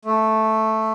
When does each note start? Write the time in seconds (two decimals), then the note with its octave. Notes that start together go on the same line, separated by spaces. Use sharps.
0.05 A3